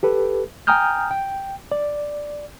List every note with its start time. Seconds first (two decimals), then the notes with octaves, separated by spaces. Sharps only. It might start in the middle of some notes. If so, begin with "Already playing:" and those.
0.03 G4 A4 B4
0.67 G5 G#5 A#5 D#6 F6 G6
1.11 G5
1.72 D5